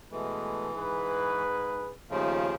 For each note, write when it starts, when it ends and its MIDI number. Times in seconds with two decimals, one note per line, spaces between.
0.12 0.70 47
0.12 1.42 52
0.12 0.70 56
0.12 0.70 57
0.76 1.91 44
0.76 1.91 68
0.76 1.91 71
2.11 2.55 39
2.11 2.55 49
2.11 2.55 53
2.11 2.50 57
2.11 2.50 63
2.11 2.50 65